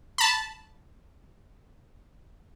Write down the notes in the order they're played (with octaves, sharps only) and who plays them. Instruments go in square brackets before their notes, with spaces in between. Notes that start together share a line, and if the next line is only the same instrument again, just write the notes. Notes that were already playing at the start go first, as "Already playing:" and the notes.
[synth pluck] A5 B5